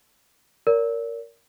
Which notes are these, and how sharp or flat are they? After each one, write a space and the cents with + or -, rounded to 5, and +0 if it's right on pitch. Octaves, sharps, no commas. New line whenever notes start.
A#4 +0 D5 -45